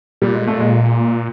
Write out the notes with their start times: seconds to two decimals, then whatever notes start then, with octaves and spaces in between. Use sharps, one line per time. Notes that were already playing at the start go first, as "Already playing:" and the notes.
0.22 A#2 G3
0.34 G#3
0.47 A3
0.60 G#3